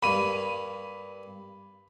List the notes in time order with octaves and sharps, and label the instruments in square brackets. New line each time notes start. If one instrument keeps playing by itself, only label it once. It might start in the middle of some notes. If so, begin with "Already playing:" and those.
[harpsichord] G2 A#3 [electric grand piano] B5 D#7